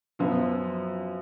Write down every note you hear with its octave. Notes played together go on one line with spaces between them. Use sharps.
F#2 F3 B3 F4